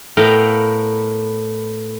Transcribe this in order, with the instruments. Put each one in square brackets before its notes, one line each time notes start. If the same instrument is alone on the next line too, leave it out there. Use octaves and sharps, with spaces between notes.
[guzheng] A2 A3 B3 A#4 F5 G5